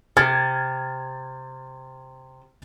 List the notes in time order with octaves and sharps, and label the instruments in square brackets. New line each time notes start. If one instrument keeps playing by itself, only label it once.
[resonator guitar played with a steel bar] C3 [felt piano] F6 G#6 A6